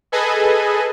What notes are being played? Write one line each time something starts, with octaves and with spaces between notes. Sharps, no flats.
G#4 A4 B4 D#5 G#5